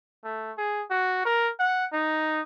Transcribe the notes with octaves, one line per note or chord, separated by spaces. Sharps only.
A3
G#4
F#4
A#4
F#5
D#4